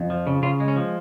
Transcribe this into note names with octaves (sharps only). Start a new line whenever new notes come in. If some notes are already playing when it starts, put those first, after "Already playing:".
Already playing: F2
F3
C#3
C#3 F4
G#3
C#4
F3